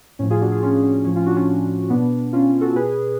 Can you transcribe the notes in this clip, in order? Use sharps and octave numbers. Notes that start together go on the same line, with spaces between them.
A2 F3 C#4
F4 G#4
D4 F#4
F4 G#4
C#4 F4
C#4
A2 F3 C#4
C#4 F4
D4 F#4
C#4 F4
B2 B3 D4
C#4 F4
F#4 A4
B2 G#4 B4